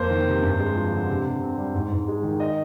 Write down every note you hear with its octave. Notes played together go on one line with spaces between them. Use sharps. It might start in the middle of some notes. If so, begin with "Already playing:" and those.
Already playing: F2 A#3 C5
D#3
C3
G2
G#3
F3
D3
C3
C3
C4
G3
G#2
G#2
G#3
D#3
D#5